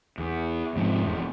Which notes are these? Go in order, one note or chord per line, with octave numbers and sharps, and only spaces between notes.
E2
G#2 C3 F3
F1 E2